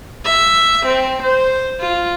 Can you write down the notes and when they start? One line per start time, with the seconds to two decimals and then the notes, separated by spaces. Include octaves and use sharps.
0.25 E5
0.86 C4
1.23 C5
1.81 F4